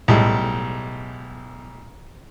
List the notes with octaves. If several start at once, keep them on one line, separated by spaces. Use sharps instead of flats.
B1 A2 G3 G#3